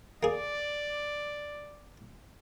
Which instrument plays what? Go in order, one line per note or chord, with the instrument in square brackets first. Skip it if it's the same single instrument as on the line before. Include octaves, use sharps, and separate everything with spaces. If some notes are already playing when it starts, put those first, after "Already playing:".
[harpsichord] A#3 G#4 [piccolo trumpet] D5